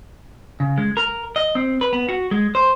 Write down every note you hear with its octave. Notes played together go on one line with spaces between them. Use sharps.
C#3
G#3
A#4
D#5
C4
B4
B3
F#4
G#3
C5